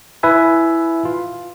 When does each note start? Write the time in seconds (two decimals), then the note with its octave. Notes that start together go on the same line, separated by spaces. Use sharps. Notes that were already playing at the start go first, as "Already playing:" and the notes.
0.23 E4 B4 E5 G#5
1.05 F4